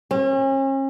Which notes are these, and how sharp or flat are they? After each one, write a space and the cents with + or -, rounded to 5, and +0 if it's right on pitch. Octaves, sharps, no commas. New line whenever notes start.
C#4 -40